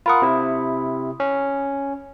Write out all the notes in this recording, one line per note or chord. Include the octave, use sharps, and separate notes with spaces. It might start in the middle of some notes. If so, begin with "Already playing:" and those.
F4 A#4 F#5 B5 D#6
C3 E4
C#4